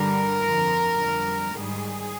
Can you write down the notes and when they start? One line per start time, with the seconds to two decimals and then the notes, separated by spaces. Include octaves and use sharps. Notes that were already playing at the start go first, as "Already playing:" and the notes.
Already playing: G2 D3 G3 A#4
0.43 F2 D3 F3
0.99 F2 D3 G3
1.54 G#2 D#3 G3 G#4